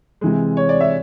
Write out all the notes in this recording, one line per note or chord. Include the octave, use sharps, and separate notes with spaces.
C3 E3 G#3
C#5
D5
E5